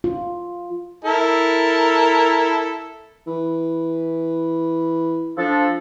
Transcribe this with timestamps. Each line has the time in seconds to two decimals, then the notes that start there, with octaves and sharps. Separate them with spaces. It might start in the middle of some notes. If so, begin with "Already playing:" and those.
0.04 F4
1.05 E4 A4 A#4
3.27 E3
5.38 F3 D4 A4